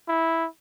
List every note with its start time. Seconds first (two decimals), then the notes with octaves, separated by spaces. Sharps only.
0.08 E4